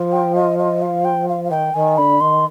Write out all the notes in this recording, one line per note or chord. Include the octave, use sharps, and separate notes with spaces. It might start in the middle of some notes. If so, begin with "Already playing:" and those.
Already playing: F3
G5
D#5
D#5
F5
G5
F5
F5
D#3 G5
D#3 G#5
D3 B5
D#3 C6